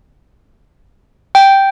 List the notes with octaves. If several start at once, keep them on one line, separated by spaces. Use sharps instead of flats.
G5